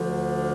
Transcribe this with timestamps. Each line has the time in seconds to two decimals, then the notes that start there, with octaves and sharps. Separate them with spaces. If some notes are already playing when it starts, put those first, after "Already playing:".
Already playing: D2 D3 F3